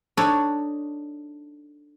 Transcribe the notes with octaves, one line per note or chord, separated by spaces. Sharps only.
D4 D#4 A4 C#5